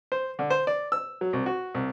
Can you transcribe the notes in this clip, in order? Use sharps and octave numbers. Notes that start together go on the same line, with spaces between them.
C5
D3
C5
D5
E6
F#3
C2
F#4
C2